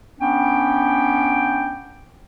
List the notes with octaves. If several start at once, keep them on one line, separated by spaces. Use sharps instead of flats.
B3 C#4 D4 G5